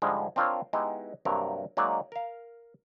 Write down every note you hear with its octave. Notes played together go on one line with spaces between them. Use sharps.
G#2 D3 F3 G3 G#3
C4 D4 F4 A#4 C5 C#5
G#3 B3 D#4 E4 G4
G2 C3 F#3 A#3 A#4 A#5
F#3 G#3 A#3 D#4 D5 F5
A#4 F5